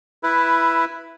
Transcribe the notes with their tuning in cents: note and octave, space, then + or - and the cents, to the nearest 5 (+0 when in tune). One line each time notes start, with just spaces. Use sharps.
E4 +10 B4 +0 E5 +10